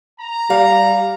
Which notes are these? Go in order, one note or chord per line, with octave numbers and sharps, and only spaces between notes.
A#5
G3 F5